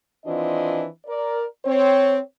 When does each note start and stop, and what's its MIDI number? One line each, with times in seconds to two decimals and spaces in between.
0.24 0.84 51
0.24 0.84 52
0.24 0.84 60
0.24 0.84 62
0.24 0.84 65
0.24 0.84 75
1.06 1.43 70
1.06 1.43 74
1.65 2.18 60
1.65 2.18 73